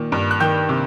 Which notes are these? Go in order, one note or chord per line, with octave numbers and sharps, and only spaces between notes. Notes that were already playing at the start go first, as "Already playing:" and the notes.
Already playing: A#2 D#3
G2
F#6
D#3 G5 G6
C3